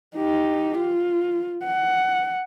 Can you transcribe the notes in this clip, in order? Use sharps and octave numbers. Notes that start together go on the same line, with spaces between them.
D#4 G4
F4
F#5